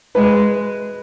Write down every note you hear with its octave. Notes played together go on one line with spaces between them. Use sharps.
G#3 B4